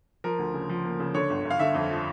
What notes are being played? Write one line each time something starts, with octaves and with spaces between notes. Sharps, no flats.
F3 A#4
D2
C#3
F3
A#3
C#3
D3 C#5
G1
G1
F5
D3 E5
F2
F3